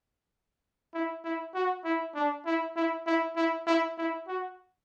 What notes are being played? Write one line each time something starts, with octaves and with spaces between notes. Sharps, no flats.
E4
E4
F#4
E4
D4
E4
E4
E4
E4
E4
E4
F#4